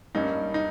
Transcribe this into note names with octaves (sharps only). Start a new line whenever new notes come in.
G2 G3 A#3 C#4 D#4
D#4